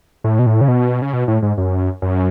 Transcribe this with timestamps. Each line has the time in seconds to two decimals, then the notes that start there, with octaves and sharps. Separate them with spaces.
0.24 A2
0.39 B2
0.46 A2
0.61 C#3
0.68 B2
1.02 C#3
1.13 B2
1.28 A2
1.42 G#2
1.58 F#2
2.02 F#2